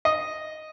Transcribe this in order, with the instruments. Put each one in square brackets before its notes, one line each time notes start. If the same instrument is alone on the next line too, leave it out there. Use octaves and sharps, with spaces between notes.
[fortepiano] D#5